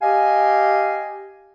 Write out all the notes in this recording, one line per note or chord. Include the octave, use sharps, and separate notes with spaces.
G4 D#5 F5 G#5